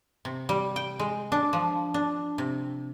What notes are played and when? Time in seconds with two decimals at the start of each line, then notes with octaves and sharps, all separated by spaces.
0.25 C3
0.49 G3
0.76 G5
0.99 G#3
1.32 D4
1.53 F3
1.94 D4
2.38 C3